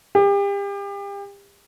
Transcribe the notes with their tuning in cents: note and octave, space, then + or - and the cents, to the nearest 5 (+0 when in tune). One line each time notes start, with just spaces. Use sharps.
G4 +35